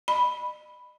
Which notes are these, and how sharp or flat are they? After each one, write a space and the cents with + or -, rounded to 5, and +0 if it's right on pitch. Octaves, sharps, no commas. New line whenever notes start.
D#5 -40 B5 +0